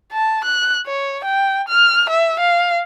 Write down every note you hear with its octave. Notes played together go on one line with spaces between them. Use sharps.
A5
F#6
C#5
G5
F6
E5
F5